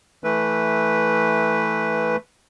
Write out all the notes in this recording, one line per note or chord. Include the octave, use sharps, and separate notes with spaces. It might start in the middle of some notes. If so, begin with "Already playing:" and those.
E3 A3 B4